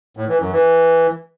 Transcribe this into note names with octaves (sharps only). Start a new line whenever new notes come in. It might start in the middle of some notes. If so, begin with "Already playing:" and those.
A2
E3
F#2
E3